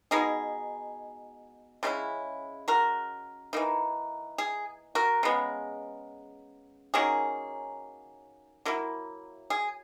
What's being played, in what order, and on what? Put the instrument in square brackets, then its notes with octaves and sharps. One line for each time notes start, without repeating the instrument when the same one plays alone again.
[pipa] B2 G#3 D#4 G#4
C#3 G#3 C#4 E4
F#4 A#4
E3 A#3 D#4
G#4
F#4 A#4
C#3 G#3 B3
D#3 F#3 A#3 C#4 G#4
F#3 A#3 E4
G#4